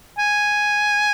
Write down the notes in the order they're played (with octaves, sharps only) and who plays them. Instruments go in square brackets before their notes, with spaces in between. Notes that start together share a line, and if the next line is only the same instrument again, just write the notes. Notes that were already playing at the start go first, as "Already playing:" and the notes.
[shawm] G#5